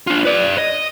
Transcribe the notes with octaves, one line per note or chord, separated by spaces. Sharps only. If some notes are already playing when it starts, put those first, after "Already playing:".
D4 F4
B4 D5
D#5